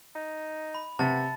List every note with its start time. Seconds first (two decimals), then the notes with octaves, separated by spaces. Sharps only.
0.15 D#4
0.75 B5
0.99 C3 B3 A5 A6